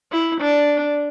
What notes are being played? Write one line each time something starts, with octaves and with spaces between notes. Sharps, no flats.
E4
D4